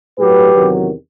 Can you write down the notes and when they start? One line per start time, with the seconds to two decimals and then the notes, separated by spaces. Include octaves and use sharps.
0.19 A2 F#3 G4 B4
0.55 E2 C3 D#3 F#3